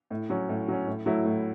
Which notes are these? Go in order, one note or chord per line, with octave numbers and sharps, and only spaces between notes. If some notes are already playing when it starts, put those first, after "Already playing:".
A2
F#3 C#4
A2
F#3 C#4
A2
F#3 A3 E4
A2